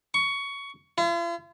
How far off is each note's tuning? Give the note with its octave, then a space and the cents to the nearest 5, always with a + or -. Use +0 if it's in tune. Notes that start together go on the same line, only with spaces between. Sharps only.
C#6 +15
F4 -45